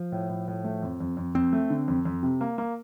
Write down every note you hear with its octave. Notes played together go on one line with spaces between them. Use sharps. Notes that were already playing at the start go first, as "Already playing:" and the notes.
Already playing: F3
A2
A2
A2
A3
F2
F2
F2
F2 C4
A3
D3
F2
F2
C3
A#3
A#3